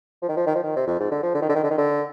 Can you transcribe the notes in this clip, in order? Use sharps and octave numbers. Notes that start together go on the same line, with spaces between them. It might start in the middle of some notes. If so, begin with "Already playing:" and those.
F3
D#3
F3
D#3
F3
D#3
C3
F2
G#2
D3
F3
D3
D#3
D3
D#3
D3
D#3
D3